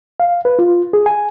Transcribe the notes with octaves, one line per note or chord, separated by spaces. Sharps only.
F5
B4
F4
G#4
G#5